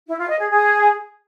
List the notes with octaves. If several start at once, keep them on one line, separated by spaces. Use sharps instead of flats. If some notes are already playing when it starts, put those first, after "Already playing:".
E4
F4
D#5
G#4
G#4